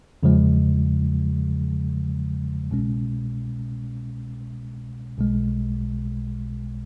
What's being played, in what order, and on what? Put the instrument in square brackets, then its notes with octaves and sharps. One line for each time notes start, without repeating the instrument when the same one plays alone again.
[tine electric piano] E2 C#3 F3 G#3
C2 B2 G#3 C#4
B1 B2 G#3